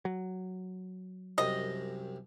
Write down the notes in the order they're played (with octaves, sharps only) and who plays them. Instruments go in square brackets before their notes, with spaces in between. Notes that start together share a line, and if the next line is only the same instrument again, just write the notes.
[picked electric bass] F#3
[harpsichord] C2 F#2 C3 [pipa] D#5